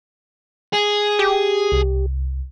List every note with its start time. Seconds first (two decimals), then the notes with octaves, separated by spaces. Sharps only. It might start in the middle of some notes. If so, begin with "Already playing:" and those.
0.73 G#4
1.19 G4
1.72 C2